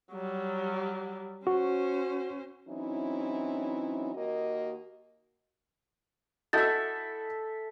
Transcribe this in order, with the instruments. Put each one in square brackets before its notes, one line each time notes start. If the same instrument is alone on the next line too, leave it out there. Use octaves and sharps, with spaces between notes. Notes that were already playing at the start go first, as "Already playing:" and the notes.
[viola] F#3 G3
[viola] C#4 C5 [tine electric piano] F#4
[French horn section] E3 F#3 C4 C#4 D#4 E4
D#2 A#3 F#4 D#5
[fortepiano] E4 F#4 D#5 [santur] A4 E5 [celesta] G6 A6